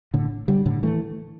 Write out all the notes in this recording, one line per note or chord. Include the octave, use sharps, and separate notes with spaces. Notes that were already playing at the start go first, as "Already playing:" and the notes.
A2 D3
D3 G3
A2 D3
E3 A3